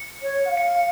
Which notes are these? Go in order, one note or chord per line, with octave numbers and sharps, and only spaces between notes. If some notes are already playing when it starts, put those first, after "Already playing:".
Already playing: C#7
C#5
F#5
F5
C#7